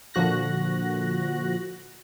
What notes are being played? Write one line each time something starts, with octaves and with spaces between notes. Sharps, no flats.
A#2 D3 F3 F#4 F#6 A#6